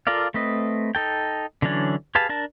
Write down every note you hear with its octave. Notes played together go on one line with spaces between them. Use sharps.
F4 A4 A#4 D5 F5
A3 C4 B4 D#5
D#4 A4 G5
D3 E3 F#3 C#4 D4
G4 G#4 B4 F5 A5
D4 A#4 A5